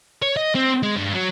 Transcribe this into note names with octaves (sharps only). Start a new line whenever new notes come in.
C#5
D#5
C4
G#3
G2
F#3